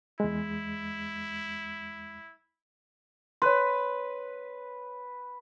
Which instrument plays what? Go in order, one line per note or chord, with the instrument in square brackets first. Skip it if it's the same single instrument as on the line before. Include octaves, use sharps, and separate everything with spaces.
[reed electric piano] E2 G#3 [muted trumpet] E4
[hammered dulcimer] B4 [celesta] C#5 C6